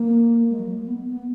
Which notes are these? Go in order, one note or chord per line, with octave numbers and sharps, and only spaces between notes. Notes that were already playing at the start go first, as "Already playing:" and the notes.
Already playing: A#3
G#3
F#3
G#3
A#3
B3
B3